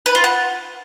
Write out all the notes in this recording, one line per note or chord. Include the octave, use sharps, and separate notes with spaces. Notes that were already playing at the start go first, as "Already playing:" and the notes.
B4
F4
F#5